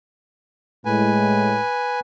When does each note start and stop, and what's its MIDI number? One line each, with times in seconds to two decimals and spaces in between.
0.85 1.59 45
0.85 1.59 56
0.85 2.00 71
0.85 2.00 80